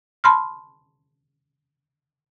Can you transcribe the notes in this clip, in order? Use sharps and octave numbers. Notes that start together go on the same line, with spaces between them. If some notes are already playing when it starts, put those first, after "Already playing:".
A5 B5 C6 F6